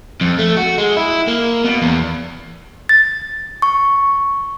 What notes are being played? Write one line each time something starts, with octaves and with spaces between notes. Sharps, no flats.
F2
A3
F#4
G#3
E4
A#3
B2
E2
A6
C#6